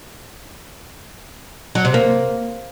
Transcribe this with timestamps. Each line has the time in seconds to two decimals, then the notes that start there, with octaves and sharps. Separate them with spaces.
1.75 F#3
1.85 C3
1.94 A#3